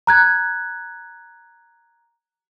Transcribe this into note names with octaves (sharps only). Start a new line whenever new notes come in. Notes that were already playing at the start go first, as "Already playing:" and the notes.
A#5 F#6 G#6